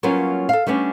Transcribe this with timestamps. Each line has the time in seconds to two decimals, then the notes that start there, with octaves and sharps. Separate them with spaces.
0.03 F#3 G3 A#3 B3 C#4 F4
0.49 A4 F5
0.67 G3 A3 B3 C#4 D4